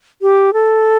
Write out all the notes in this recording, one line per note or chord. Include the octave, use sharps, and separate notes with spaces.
G4
A4